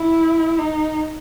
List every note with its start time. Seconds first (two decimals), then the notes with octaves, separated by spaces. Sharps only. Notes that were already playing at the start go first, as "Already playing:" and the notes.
Already playing: E4
0.59 D#4